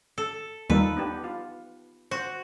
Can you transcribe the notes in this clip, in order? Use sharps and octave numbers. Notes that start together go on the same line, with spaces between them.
A4
D#2 D#3 G3 D#4 F4 A4 B4
B3 D4 G4
F4
F#4 C5